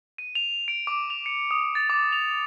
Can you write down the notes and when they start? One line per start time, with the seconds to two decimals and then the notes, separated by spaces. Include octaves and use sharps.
0.18 D#7
0.35 F7
0.68 D7
0.87 D6
1.10 F7
1.26 C#7
1.51 D#6
1.75 A6
1.90 D6
2.12 F7